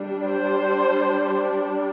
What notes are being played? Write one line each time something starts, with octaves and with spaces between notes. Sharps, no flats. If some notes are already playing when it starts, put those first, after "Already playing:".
Already playing: G3 D4
C5